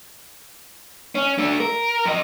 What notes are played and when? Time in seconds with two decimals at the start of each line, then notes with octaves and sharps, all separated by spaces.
1.15 C#4
1.38 A3 D4
1.60 A#4
2.05 F2 D#5